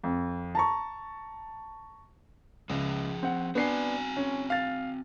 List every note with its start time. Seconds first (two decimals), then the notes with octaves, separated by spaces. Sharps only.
0.03 F2
0.55 A5 A#5 C#6
2.69 C#2 F3 G#4
3.23 C4 F#5
3.55 B3 C4 D4 F#4 G#5 C7
4.17 C#4
4.50 F5 A6